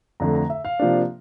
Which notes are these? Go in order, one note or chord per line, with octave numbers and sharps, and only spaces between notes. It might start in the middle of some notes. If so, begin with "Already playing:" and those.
F2 D3 A3 A#5
A#5
E5
F5
C3 F3 A#3 D4